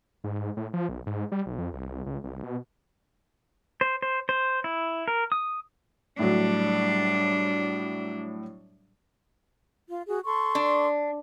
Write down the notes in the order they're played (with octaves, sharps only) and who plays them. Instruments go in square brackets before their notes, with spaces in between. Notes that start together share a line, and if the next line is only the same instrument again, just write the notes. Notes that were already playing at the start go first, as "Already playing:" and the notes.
[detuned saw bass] G#2
A2
F3
B1
G#2
G3
B1
F2
C2
C#2
C2
B2
[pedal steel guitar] C5
C5
C5
E4
A#4
D#6
[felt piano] A2 F#3 [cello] G3 D4
[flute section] F4
F#4 G#4
A4 C6 C#6
[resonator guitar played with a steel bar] D4